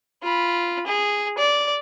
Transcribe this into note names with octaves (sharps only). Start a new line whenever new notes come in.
F4 B5
G#4
D5